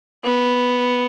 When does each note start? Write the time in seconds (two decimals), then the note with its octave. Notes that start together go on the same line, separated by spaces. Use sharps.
0.25 B3